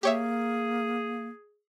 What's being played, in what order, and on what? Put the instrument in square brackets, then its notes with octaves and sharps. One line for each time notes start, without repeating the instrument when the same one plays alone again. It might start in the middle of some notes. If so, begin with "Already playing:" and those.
[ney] A#3 [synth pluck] G4 C#5 E5 [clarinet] G#4